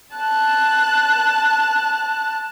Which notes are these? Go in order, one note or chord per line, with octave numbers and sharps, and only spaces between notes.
A5 F#6